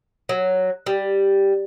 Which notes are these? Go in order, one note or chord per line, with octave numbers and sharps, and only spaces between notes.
F#3
G3